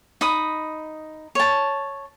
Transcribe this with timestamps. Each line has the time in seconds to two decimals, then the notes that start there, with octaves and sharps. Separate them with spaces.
0.21 D#4 B5 D#6
1.35 C#5 A5